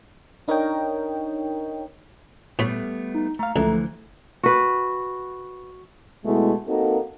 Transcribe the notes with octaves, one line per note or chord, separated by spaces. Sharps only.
D4 D#4 A#4 C#5 D#5 G5
A2 G3 A3 B3 C#5 B5
D#4
A3 F5 A#5
C#2 D3 E3 F3 A3
F#4 B4
B2 G#3 A3 B3 E4 F#4
A#3 C4 D#4 F#4 A4 A#4